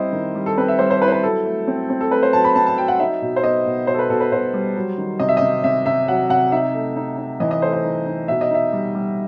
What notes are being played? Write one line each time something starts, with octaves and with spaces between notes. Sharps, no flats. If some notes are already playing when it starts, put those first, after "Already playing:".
Already playing: G3 C4 E4 C5 D#5
D#3
G3
A4
C4 B4
E5
G3 C5
C5
E4 B4
C5
B4
F#3 A4
A3
C4
C4
A4
A3 B4
C5
F#3 A5
B5
C4 A5
A5
F#3 G5
F#5
D#4 E5
B2
C5
B3 D#5
B2
B2 C5
A4
B4
B2 A4
B4
B2 C5
G3
F#3
D#3
C3 D#5
E5
C3 D#5
C3 E5
C3 E5
F#3 F#5
C3 F#5
D#4 E5
A3
D#4
D#4
E3 D#5
D#5
A3 C5
C5
D#4
D#4
B2 E5
D#5
D#4 E5
G3
G3